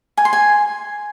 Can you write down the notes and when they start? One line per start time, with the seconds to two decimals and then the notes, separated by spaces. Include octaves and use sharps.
0.17 G#5
0.25 C6
0.33 G#5